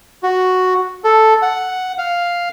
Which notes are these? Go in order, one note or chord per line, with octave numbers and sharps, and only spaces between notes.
F#4
A4
F#5
F5